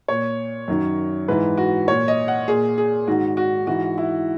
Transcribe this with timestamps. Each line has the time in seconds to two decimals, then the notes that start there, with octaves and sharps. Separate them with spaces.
0.08 A#2 C#5
0.68 F#2 D#3
1.28 G#2 E3 B4
1.58 F#4
1.88 A#2 C#5
2.08 D#5
2.28 F#5
2.48 A#2 G#4
2.78 G#4
3.07 G#2 D#3 F#4
3.37 F#4
3.67 G#2 E3 F#4
3.98 E4